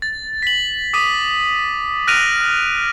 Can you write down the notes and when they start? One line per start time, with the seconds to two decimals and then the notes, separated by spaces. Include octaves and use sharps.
0.02 A6
0.42 B6 F#7
0.93 D6 D#6 B6 D#7
2.07 F6 F#6 A#6 D7 D#7 F7